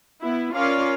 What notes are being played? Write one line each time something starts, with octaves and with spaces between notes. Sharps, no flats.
B3 E4
C#4 F4 A#4 C#5 D5 F5